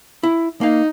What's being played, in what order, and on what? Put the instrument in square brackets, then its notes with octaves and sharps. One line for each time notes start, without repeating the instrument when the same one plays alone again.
[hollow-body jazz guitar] E4
[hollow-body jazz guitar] A#3 F5 [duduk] D#4